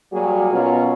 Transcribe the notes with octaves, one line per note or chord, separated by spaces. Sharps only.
F#3 G3 A#3 F#4 G#4
B2 F#3 C#4 F4 A#4